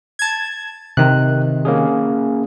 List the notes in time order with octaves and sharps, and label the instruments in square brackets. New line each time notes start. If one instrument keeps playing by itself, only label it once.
[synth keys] A5 G#6
[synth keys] C3 D#3 [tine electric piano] F#6
[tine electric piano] A#3 C#4 G#4